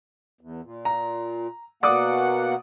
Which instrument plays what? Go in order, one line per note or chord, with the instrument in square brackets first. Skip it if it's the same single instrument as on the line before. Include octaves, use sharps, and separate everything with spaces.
[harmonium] E2
A#2
[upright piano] A#5
[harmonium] B2 A#3 F#5 [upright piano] D5 D6 D#6